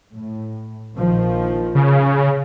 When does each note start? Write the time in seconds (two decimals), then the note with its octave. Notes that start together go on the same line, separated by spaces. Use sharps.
0.14 A2
0.95 A#1 D#3 F3
1.75 C#3